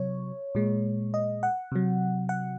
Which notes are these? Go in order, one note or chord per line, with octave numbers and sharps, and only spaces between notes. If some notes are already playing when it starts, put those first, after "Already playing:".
Already playing: C3 F#3 C#5
A#2 G#3
D#5
F#5
C3 F#3
F#5